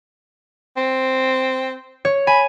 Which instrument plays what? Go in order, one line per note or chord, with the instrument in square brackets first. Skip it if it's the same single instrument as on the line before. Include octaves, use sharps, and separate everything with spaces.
[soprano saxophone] C4
[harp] C#5
[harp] G#5 [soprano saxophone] B5